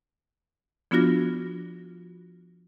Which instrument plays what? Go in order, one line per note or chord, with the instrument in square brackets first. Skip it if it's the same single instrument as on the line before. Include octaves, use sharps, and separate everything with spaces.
[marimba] F3 B3 D4 F4 F#4 A#6